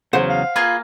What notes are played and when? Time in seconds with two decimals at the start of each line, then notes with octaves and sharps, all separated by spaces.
0.13 E2 C#3 F#3 C5 F#5
0.29 F5
0.56 A#3 F4 G#4 B4